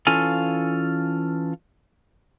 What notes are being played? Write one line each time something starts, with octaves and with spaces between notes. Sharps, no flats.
E3 C#4 F4 A4 F5 G#5